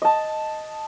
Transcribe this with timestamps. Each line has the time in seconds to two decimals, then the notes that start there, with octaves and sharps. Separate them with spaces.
0.02 D#5 A5